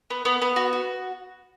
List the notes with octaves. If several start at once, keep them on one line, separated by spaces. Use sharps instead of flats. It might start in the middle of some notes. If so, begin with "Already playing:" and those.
B3
B3
B3
F#4
F#4